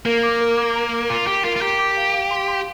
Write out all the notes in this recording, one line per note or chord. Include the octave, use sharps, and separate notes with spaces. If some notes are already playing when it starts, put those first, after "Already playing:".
A#3 A#4
D6
A#4
D6
A#5
D6
F4 D6
G4 D6
F4 A#4
F4
G4 A#5
D6
F5
F5
C6
C6